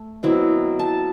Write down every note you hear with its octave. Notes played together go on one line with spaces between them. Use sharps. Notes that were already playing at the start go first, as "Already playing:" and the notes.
Already playing: A3
B2 F#3 C4 E4
A5